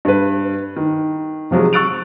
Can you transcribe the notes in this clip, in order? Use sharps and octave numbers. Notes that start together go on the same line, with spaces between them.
G2 B4
D#3
C3 F3 F#3 G#3
C#6 E6 F#6 A6 D7 F7